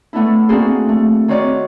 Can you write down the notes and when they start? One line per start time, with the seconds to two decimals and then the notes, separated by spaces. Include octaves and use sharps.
0.13 A3 B3 D4 E4
0.49 A#3 C4 D4 F#4 G#4 C5
0.89 A3
1.28 D#3 C4 F#4 C#5 D5